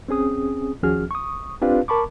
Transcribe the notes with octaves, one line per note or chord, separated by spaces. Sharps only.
C4 C#4 G#4 D#6
D#2 F3 C#4 F#4 G#4 F6
C#6 D#6
C4 D4 F4 G4 B4 F5
A#4 A5 B5 C#6 D6